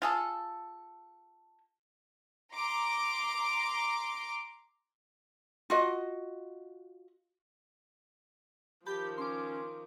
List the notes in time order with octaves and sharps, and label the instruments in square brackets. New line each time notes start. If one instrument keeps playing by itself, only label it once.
[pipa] F4 G#4 A4
[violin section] A#5 C6 D6
[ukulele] F4 F#4 D#5
[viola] D#3 F3 [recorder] G4 [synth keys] A5 B5 G6
[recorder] C#4 [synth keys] C6 D6